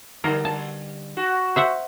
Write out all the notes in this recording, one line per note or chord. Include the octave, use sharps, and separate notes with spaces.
D3 G3 A#4
A5
F#4
C5 E5 F#5